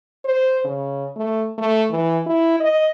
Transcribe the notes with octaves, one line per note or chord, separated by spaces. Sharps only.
C5
C#3
A3
A3
E3
E4
D#5